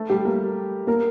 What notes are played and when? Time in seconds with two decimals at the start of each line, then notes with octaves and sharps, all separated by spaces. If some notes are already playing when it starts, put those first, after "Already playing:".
Already playing: A3 A4
0.10 G3 G4
0.25 A#3 A#4
0.87 A#3 A#4